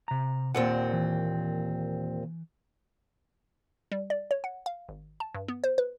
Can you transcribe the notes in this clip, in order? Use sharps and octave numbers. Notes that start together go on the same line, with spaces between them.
C3 A#5
D#2 A#2 C4 D5 F#5
E3
G3
D5
C#5
F#5
F5
G#1
A5
G2
B3
C5
B4